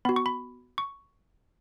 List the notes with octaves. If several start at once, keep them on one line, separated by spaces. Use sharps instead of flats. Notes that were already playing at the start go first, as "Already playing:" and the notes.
B3 F#4 B5
C#6
B5
C#6